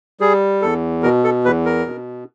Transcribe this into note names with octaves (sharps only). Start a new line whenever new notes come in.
G3 G#4
E2 A4
B2 A#4
A4
E2 B4
A#4
B2